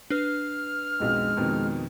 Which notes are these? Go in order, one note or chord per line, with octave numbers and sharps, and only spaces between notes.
D4 B4 F6
B1 F2 G#3
F2 B2 D#3